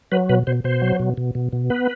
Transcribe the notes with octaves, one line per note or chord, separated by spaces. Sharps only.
F#3 B4
B2 B4
B2 C5
B2 C5
F#3
B2
B2
B2
B2
B3 B4